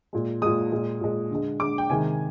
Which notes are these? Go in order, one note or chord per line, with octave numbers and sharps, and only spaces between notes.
A#2 G#3
A#2 G#3 D#6
A#2 G#3
A#2 G#3
D3 G#3
D3 G#3 D6
G5
C3 D#3 G#3 G#5